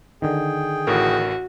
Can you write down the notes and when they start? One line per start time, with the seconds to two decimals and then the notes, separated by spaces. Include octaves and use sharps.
0.22 D3 D#3 G#4 G5
0.87 A1 A2 F#4 A#4